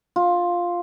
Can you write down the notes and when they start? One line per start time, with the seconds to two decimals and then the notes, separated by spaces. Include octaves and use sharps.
0.16 F4